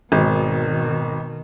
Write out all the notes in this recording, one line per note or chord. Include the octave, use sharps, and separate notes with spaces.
G#1 B2 D#3